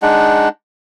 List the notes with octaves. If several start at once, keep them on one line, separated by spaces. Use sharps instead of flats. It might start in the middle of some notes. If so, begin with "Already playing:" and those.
G#3 D4 D#4 F#5